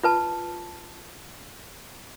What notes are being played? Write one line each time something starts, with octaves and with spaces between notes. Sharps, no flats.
F4 B4 A5